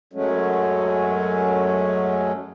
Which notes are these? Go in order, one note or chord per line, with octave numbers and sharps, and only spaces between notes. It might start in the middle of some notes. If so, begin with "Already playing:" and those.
F#2 F#3 G#3 A3 C#4